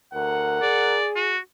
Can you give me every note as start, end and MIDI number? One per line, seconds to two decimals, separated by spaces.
0.14 0.60 38
0.14 1.00 70
0.14 1.00 78
0.62 1.34 68
0.62 1.07 74
1.16 1.38 66